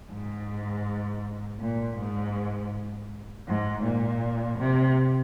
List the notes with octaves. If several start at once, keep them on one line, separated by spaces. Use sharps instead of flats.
G#2
A#2
G#2
G#2
A#2
C3